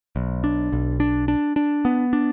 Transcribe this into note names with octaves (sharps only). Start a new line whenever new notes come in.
B1
D4
B1
D4
D4
D4
B3
D4